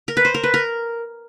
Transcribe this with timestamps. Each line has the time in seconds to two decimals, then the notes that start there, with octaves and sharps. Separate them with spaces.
0.08 A#4
0.17 B4
0.25 C5
0.34 A#4
0.44 B4
0.54 A#4